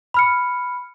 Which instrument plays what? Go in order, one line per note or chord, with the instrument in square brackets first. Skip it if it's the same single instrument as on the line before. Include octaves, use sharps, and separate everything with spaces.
[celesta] B5 F6 C#7